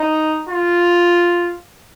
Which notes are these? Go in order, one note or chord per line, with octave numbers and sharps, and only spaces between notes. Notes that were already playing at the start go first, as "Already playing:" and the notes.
Already playing: D#4
F4